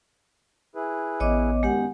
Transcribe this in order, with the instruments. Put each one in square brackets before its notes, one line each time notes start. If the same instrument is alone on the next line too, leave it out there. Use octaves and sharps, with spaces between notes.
[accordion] E4 G#4 B4
[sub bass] A1 [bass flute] B3 [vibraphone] C#5 D#5 D6
[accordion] F#2 D#3 [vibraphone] G#3 G4 F#5